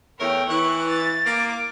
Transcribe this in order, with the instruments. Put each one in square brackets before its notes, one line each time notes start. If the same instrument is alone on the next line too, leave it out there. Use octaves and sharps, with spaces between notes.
[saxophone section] E2 A3 A#4 [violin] C#5 G5
[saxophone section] E3 [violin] C#6 F#6
[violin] A6
[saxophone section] A#3 [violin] D6